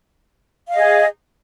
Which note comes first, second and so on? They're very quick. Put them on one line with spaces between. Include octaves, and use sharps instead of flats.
F5 D#5 G#4